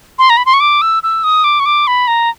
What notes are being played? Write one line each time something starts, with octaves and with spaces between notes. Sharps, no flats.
C6
A#5
B5
C6
C#6
D6
E6
E6
D#6
D6
C#6
D6
B5
A#5